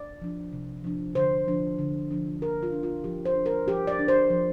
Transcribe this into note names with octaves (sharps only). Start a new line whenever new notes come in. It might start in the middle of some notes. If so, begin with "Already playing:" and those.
Already playing: D5
F3 D4
C3
F3 D4
D3 C5
F3 D4
D3
F3 D4
F3 A#4
F4
D4
F4
F3 G4
C5
D4
A#4
F3 G4
D5
D4
C5
F3